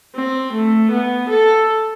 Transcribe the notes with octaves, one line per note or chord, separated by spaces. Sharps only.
C4
A3
B3
A4